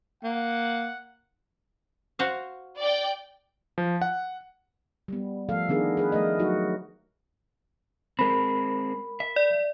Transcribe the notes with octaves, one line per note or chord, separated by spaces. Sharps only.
A#3 F#5
F#4 C5 F5
D5 G5
F3
F#5
G3 B3
F3 A3 A4 F5
D#3 B3 D4 G#4 A#4
G#4 B4
F3 A3 A#4 D#5
F#3 D#4 F#4
G#3 C4 A#4 B5
E5
D5